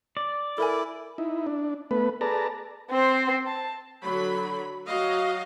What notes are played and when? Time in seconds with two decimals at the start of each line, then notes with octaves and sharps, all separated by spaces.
0.17 D5
0.58 E4 A4 A#4 G#5
1.18 D#4 E4
1.47 D4
1.91 A3 B3 B4
2.21 G#4 A4 B4 D5 A5 A#5
2.91 C4 C5
3.47 A5
4.03 D3 F#3 B5
4.86 F#3 F#4 D#5 F5